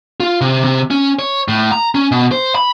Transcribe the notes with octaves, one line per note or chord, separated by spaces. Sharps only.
F4
C3
C3
C#4
C#5
A2
A#5
C#4
B2
C5
B5